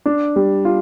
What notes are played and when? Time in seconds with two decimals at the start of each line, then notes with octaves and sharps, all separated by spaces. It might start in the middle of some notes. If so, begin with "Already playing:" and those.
0.06 D4
0.36 G3
0.65 F4